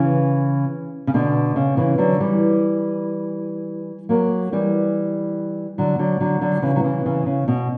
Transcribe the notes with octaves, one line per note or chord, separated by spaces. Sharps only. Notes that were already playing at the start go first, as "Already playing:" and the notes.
Already playing: C#3 E3
C#3
B2 D3
C#3
C#3 E3
D3 F#3
E3 G3
F#3 A#3
E3 G3
D3 F#3
D3 F#3
D3 F#3
D3 F#3
C#3 E3
F#3
C#3 E3
C#3 E3
C#3
B2